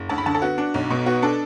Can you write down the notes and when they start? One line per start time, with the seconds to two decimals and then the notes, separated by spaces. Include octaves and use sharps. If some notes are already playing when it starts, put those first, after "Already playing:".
Already playing: F#1
0.09 D2 A5
0.18 B5
0.26 D3 A5
0.34 A4
0.42 B3 F#4
0.58 D4
0.74 B1
0.90 B2
1.06 B3 F#4
1.22 D4 A4